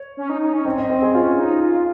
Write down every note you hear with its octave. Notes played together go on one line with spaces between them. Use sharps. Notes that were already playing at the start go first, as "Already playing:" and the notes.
Already playing: C#5
C#4
D#4
D#4
C#4
C4 D#5
D#5
C4 C5
G#4
C#4 F4
D#4
F4